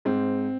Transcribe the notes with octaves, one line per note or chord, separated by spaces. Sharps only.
G#2 C4